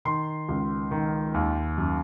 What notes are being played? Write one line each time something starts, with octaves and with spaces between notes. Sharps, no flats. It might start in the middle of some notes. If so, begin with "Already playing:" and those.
D#3 C6
C#2
D#3
D#2
F#2